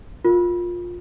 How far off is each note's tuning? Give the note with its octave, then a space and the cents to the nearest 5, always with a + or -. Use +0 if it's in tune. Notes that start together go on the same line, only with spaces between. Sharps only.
F4 +15 A#4 +0